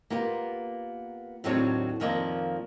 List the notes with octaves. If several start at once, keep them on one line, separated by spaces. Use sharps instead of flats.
A#3 B3 F4 G4
D#2 A2 F#3 C4 D4 C#5
F2 D#3 F3 A#3 C#5 D5